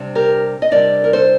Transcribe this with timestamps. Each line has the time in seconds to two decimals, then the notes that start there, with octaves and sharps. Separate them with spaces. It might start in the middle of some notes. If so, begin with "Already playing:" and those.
Already playing: C3 G3 D4
0.15 G4 A#4
0.62 D#5
0.71 C3 G3 D4 A#4 D5
1.04 A#4
1.13 A4 C5